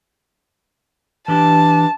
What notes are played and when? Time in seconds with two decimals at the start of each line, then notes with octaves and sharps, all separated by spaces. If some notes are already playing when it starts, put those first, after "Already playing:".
1.28 E3 D4 G4 A5